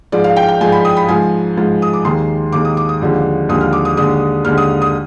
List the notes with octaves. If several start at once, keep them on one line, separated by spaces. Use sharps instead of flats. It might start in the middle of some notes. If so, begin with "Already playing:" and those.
G#2 F3 G#3 D5
F5
G5
G5
G#2 F3 G#3 G#5
B5
D#6
B5
G#2 F3 G#3 G#5
G#2 F3 G#3
D#6
D6
D#2 D#3 G#3 C6
D#2 D#3 G#3 D6
D#6
D6
D#6
D#2 D3 F3 G#3
D#2 D3 F3 G#3 D#6
F6
D6
D#6
D#2 D3 G#3 D#6
D#2 D3 G#3 F6
D#6
D#6